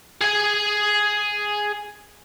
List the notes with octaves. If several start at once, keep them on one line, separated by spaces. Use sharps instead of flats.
G#4 G#5